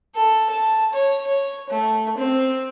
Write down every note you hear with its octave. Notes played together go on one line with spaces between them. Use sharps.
A4
A5
C#5
C#5
A3
C4